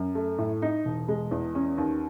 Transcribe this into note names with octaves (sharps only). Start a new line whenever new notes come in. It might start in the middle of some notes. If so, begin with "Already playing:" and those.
Already playing: F#2
A3
A2
D#4
E1
G#3
E2
C#4
D#2